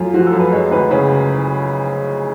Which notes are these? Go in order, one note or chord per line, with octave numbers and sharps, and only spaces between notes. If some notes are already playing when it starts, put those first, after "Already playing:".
Already playing: F#2 A3 F4
F3 F#4
A4
F#2
B4
G#3 C#5
D2 B4
C#3 B4